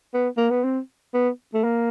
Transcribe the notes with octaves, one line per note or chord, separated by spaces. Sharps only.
B3
A#3
B3
C4
B3
A3
A#3